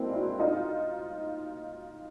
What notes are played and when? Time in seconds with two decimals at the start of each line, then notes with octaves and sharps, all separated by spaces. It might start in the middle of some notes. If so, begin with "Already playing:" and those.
Already playing: G#3 A#3 C4 D4 E4
0.13 E4 F#4
0.40 D#4 F4